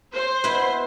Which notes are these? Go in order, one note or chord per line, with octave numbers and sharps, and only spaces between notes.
C5
B2 E4 B4